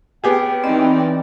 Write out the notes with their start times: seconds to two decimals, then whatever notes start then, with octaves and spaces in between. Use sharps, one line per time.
0.24 B3 C#4 G4 G#4 G5
0.64 E3 C4 D#4 D5 D#5 B5